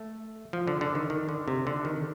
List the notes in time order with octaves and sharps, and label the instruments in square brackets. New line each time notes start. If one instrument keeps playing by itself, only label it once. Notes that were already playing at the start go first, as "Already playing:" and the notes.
Already playing: [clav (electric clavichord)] A3
F3
D3
D3
D#3
D#3
D3
C3
D3
D#3